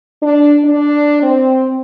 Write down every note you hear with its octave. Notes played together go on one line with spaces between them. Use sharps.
D4
D4
C4